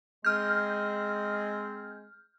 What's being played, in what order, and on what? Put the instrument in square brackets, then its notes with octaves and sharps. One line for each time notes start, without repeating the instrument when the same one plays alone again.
[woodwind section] G#3 C4 G#4 [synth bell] F6 G6